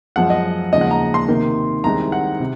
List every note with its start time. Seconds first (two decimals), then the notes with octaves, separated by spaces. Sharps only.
0.16 F#2 F3 G#3 F#5
0.30 D#5
0.72 D#2 C#3 F3 G#3 D#5
0.81 F#5
0.91 A#5
1.14 C6
1.28 C3 D#3 A#3
1.84 C2 C3 D#3 G#3 C4 A#5
2.12 F#5
2.40 C3